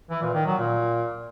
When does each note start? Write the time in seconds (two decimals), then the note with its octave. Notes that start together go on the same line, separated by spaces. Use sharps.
0.10 E3
0.22 A#2
0.34 D#3
0.46 F#3
0.58 A#2